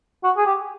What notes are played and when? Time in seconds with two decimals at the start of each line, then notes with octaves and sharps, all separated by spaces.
0.24 F#4
0.37 G#4
0.46 G4